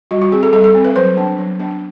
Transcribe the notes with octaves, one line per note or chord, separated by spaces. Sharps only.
G3 F#4
F#4
C4 G#4
A4
G3 A4
A4
C4
B4
F#3 C5
B3 D4
F#3
B3 D4